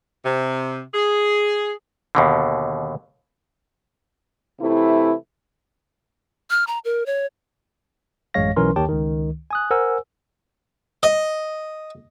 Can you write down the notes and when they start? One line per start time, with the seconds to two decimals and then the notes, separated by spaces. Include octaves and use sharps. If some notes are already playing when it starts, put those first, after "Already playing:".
0.25 C3
0.94 G#4
2.15 D#2 B2 D3
4.60 C3 E3 A3 E4
6.50 F6
6.67 A#5
6.85 A#4
7.06 C#5
8.34 A1 F#2 G#3 C#5 F5 A#6
8.56 B1 E3 C#4 A#4 C6
8.76 D#2 D#3 G4 C#5 G5 A5
8.88 C#2 D#3
9.51 G#5 D#6 F#6
9.71 A#4 C5 F#5 G#5 E6
11.03 D#5